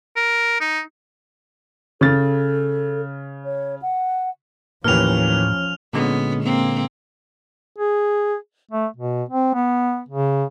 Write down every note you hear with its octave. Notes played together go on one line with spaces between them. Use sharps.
A#4
D#4
C#3 A4 A6
C#5
F#5
D#2 A2 E3 F3 A#3 C#4 F6 F7
A#2 D3 G#3 B3 C#4
A#3 C4
G#4
A3
B2
C4
B3
C#3